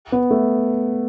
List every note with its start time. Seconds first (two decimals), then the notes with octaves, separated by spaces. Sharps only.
0.12 B3
0.31 A3